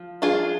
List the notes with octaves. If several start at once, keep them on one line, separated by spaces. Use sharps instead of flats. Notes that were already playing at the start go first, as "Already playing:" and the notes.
Already playing: F3
D4 F4 G#4